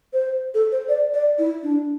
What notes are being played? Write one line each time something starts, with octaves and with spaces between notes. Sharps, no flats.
C5
A4
C5
D5
D5
E4
D4